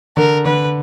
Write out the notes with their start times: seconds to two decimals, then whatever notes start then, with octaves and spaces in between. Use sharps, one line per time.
0.17 D3 A#4
0.45 D3 B4